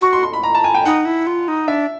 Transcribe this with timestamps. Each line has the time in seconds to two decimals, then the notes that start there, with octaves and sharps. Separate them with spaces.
0.02 F#4 C#6
0.13 C6
0.23 C6
0.33 B5
0.43 A#5
0.55 A5
0.64 G#5
0.74 G5
0.85 D#4 F#5
1.05 E4
1.27 F4
1.48 D#4
1.68 D4 E5